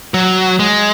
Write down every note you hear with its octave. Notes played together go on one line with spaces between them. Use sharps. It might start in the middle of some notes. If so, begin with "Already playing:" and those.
F#3
G#3